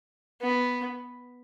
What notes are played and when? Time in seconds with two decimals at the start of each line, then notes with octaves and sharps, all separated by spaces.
0.42 B3